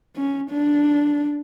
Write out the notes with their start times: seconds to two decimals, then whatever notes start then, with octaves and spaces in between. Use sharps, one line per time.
0.16 C#4
0.50 D4